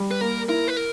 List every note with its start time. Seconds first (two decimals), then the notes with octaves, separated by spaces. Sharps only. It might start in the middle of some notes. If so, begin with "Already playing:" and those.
Already playing: G3
0.11 B4
0.21 A#3 A#4
0.49 E4 A#4
0.68 B4
0.77 A#4